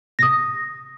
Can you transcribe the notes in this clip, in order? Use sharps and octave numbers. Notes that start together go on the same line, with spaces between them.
D#6 A#6